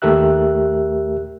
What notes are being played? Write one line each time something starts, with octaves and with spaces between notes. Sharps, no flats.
D#2 A3 G4 A#4 E5 F#6